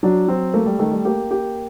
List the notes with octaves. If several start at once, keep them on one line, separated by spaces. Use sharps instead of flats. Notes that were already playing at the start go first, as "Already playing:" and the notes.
F#3 D4
F#3 C4
A3 A#3
G3
D#3 A3
G3
A#3 G4
G4